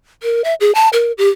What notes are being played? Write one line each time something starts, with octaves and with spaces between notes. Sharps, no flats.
A#4
E5
G#4
A5
A#4
G4